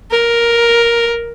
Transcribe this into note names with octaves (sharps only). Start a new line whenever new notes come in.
A#4